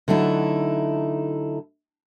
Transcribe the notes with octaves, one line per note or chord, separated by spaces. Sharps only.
D3 F#3 A3 D#4 E4